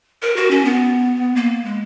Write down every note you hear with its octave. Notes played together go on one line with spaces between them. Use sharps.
A#4
F#4
C#4
B3
A#3
G#3